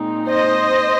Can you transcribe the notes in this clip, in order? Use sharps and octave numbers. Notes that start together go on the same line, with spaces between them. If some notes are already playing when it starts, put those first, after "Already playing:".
Already playing: A#2 G#3 C4 D#4
C5 D#5